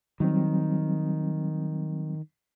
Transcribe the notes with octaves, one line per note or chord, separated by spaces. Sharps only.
D#3 F#3 G3 C4